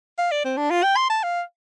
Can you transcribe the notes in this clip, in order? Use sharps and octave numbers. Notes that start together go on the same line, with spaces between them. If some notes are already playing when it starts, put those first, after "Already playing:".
F5
D5
C4
D4
F4
G5
C6
A5
F5